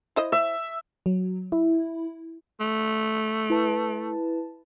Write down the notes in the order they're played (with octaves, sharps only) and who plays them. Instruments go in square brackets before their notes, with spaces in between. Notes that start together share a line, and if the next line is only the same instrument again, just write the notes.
[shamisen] E4 C5 D#5
[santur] E5
[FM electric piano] F#3
E4
[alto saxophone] A3
[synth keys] E4 B4 A5